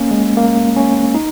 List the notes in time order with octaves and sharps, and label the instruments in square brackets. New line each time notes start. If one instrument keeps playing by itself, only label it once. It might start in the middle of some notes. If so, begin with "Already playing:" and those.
Already playing: [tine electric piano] A#3 C#4
G#3
A#3
C#4
D#4